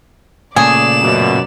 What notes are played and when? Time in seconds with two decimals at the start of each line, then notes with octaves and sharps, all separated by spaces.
0.56 A#2 C#3 A3 G#4 D5 E7
1.01 F#2 B2